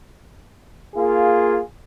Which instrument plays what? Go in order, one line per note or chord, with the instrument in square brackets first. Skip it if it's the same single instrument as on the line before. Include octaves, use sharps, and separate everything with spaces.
[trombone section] A#3 F4 G#4